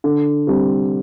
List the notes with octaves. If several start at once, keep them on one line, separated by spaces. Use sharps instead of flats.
D3
G3 C4 G4